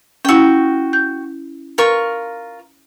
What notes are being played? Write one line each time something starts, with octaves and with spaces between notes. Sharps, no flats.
C#4 E4 F#4 G5
G6
F4 A#4 C#6